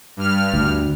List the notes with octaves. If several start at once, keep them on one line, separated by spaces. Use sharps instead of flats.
G2 F6
D2